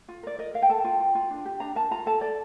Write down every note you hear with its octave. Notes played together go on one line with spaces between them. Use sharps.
F4
A#4 D5
A#4 D#5
A#4 F5
G5
A4 A5
F4 G5
F4
F4
D4
G4
D4 A#5
A#4 A5
F4 A#5
A4 A5
A4 D5